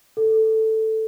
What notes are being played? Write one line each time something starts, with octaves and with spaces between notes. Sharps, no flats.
A4